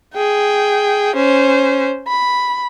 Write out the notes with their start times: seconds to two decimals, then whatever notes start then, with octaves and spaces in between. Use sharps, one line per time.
0.14 G#4 G5
1.16 C#4 C5
2.08 B5